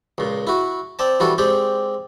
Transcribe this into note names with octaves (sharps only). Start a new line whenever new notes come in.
C#2 A#2
E4 F#4
C4 D5 A5
E3 G3 F#4 A4
G#3 C4 G4 D5